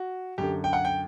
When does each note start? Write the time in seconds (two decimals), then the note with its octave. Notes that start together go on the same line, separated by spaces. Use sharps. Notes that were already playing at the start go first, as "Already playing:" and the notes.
Already playing: F#4
0.38 F#2 D3 G4
0.64 G5
0.73 F#5
0.85 G5